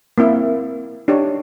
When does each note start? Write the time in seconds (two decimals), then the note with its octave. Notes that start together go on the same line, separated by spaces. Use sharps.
0.18 A#3 C4 E4 E5
1.08 D4 D#4 G4 C#5